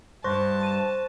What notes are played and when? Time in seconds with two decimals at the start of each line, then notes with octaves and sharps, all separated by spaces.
0.24 G2 C5 A5 C#6 F#6 A#6
0.63 D#7 E7